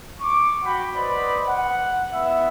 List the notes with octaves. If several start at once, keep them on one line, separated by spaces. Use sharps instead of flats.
C#6 D6
F#4 F#5 G5 B5
B4 C5 D5 D#5 B5
F#5
B3 E4 E5